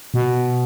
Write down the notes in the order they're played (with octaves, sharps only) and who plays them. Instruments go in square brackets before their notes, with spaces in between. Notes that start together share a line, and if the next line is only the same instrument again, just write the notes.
[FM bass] B2